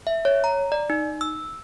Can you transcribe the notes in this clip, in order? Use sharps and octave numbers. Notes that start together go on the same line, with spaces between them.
E5
C#5
A#5
D5
D#4
E6